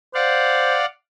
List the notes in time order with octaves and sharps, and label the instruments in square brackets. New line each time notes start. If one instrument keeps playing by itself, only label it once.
[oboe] C5 [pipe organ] D5 F5 F#5